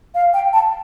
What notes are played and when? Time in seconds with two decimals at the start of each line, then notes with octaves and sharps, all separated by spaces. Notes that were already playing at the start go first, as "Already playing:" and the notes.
0.15 F5
0.34 G5
0.53 A5